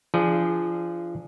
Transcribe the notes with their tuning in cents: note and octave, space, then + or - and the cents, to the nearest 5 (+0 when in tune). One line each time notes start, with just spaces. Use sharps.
F3 -25 D4 +0 G#4 +0